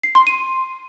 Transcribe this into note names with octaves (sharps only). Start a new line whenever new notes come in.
C7
C6
D#7